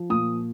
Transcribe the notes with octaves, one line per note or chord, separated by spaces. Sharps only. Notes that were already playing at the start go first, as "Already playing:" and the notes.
Already playing: F3
A#2 D#6